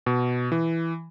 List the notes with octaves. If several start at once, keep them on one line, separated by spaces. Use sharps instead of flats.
B2
E3